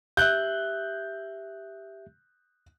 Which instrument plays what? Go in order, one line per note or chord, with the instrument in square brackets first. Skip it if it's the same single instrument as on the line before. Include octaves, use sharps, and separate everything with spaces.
[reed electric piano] G4 E5 [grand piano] F#6 G6